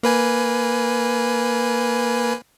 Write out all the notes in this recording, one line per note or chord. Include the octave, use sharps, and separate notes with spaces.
A#3 B4 G#5